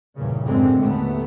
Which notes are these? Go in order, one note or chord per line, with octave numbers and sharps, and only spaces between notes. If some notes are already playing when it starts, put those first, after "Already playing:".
E2 G2 A#2 C#3
F#2 A2 D3 G#3 C4
D#2 A3 B3